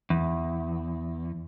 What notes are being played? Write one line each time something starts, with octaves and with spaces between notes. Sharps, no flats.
E2